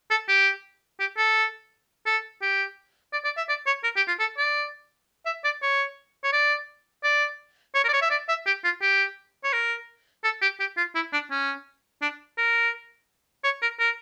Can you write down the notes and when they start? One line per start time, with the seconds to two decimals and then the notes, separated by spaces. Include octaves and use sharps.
0.11 A4
0.28 G4
1.00 G4
1.17 A4
2.06 A4
2.42 G4
3.13 D5
3.25 D5
3.37 E5
3.48 D5
3.66 C#5
3.84 A#4
3.96 G4
4.08 F4
4.20 A4
4.38 D5
5.26 E5
5.44 D5
5.62 C#5
6.24 C#5
6.33 D5
7.04 D5
7.75 C#5
7.84 A#4
7.89 D5
7.93 C#5
8.02 E5
8.11 D5
8.28 E5
8.46 G4
8.64 F4
8.82 G4
9.44 C#5
9.53 A#4
10.24 A4
10.42 G4
10.60 G4
10.77 F4
10.95 E4
11.13 D4
11.31 C#4
12.02 D4
12.38 A#4
13.44 C#5
13.62 A#4
13.79 A#4